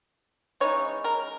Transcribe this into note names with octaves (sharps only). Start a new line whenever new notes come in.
C#3 E3 G#3 D#4 C#5
A#4